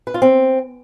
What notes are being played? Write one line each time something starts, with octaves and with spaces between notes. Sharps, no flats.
B4
F4
C4